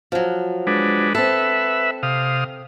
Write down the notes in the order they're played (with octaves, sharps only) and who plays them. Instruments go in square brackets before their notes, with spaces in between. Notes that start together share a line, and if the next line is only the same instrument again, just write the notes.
[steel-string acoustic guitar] F3 F#3
[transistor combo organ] G#3 D4 B4
[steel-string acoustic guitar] C4 A4 [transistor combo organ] B4 E5
[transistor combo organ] C3 F5 D#6